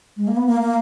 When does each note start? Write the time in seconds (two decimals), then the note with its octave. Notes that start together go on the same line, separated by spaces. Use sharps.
0.17 G#3
0.28 A#3
0.37 B3
0.46 A#3
0.61 A#3